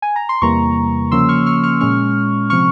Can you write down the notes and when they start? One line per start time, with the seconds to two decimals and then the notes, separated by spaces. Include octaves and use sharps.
0.02 G#5
0.16 A#5
0.29 C6
0.42 E2 C3 E3 G3 A#3 A#5 C#6
1.11 C#3 F3 A#3 C#4 C6 E6
1.29 C#6 F6
1.46 C#6 F6
1.63 C#6 F6
1.81 A#2 G#3 C#4 C#6 F6
2.50 C3 F3 C4 C#6 F6